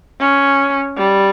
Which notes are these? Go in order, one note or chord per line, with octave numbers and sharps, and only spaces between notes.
C#4
G3